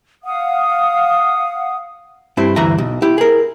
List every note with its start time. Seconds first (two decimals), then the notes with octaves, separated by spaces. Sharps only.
0.24 F5 F#5 D#6
2.37 G2 C4 E4 C5
2.56 D2 G2 E3 E5 A#5
2.78 B1
3.02 E4 G4
3.18 G#4 A#4